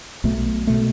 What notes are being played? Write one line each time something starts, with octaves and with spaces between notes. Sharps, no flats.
B1 B2 A3
B2 A3